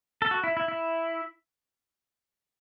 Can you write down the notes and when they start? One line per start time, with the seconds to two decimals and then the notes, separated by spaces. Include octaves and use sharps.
0.22 A4
0.31 F#4
0.44 E4
0.57 E4
0.68 E4